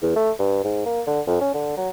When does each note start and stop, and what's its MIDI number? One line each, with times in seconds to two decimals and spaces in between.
0.02 0.12 40
0.16 0.31 57
0.39 0.61 43
0.64 0.85 44
0.85 1.01 58
1.07 1.21 50
1.27 1.38 41
1.41 1.53 61
1.54 1.76 50
1.77 1.89 54